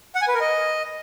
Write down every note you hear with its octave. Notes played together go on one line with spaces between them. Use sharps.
F#5
G#5
B4
A#4
D#5